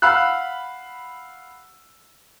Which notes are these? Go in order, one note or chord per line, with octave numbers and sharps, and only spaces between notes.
F5 F#5 B5 E6 F#6